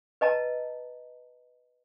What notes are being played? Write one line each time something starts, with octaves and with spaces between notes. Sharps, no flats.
B4 D#5 A5 A#5